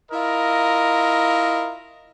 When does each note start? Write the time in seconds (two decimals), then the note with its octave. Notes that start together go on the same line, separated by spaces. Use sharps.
0.12 E4 F4 A#4 D#5